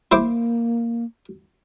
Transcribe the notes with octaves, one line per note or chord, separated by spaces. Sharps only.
A#3 E4 C5 D6